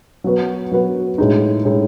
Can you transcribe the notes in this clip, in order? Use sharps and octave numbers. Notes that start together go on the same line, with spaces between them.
F#3 B3 F#4 B4
F#3 B3 F#4 B4
A2 G#3 D#4
A2 G#3 D#4